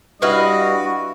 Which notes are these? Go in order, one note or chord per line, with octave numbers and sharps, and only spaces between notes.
G2 E4 F#4 B4 D#5 F5